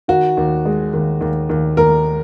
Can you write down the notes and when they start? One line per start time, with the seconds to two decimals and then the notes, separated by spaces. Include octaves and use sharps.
0.08 D#3 F#4
0.37 D#2
0.65 G#3
0.93 D#2
1.21 D#2
1.49 D#2
1.77 D#2 A#4